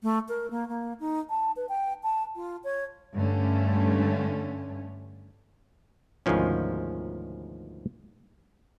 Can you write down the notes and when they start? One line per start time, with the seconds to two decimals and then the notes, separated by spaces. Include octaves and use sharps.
0.03 A3
0.28 A#4
0.50 A#3
0.68 A#3
1.00 D#4
1.30 A5
1.56 B4
1.69 G5
2.03 A5
2.35 F4
2.64 C#5
3.15 G2 D3 A3 C#4
6.26 D2 G#2 B2 D#3 F3 C#4